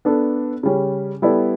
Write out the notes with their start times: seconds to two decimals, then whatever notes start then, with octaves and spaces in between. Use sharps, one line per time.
0.05 B3 D4 A4
0.63 C#3 G3 C#4
1.22 G3 B3 E4 A4 D5